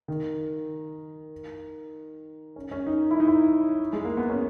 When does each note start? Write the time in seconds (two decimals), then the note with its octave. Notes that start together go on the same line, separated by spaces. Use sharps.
0.08 D#3
2.56 C#4
2.71 C#4
2.86 D#4
3.11 E4
3.20 D#4
3.28 E4
3.93 G#3
4.05 A#3
4.17 B3
4.29 C#4